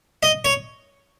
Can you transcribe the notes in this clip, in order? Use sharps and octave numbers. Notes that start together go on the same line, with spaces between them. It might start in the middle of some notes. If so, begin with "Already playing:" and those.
D#5
C#5